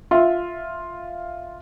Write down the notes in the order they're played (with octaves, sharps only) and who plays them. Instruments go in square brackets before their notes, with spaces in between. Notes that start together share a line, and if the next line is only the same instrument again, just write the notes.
[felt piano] F4 E5